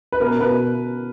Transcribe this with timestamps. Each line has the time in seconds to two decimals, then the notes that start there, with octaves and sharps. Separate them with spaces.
0.12 B4
0.20 B2 A#4
0.40 B2 B4